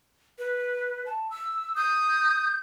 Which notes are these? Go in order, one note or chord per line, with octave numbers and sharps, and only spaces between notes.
B4
A5
E6
D#6 G6